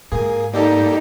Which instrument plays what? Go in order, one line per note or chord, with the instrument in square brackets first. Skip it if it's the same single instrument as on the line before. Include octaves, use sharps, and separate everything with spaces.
[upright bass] G#2 [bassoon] A#3 [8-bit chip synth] G#4
[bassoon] G3 [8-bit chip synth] A#3 G4 A4 [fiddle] D#4